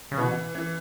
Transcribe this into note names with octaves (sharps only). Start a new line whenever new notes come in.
C#3
B2 E3
E3